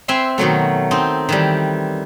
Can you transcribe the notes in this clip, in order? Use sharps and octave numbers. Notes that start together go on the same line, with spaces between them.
C4 B4 E5 G#5 C6
B2 D#3 F#3 A3
C4 D#4 A4
D#3 E3 G3